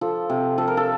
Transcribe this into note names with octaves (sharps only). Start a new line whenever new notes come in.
F3 A4
C3
F3 A4
A#4
A4